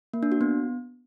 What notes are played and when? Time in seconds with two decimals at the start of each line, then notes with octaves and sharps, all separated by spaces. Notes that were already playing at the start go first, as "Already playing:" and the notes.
0.13 A#3
0.23 D4
0.32 F#4
0.41 B3